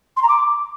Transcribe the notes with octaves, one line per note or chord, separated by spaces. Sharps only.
C6
A#5
D6